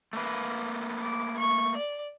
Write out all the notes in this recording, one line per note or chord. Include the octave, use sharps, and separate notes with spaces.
A3 A#3 B4
D6
C#6
D5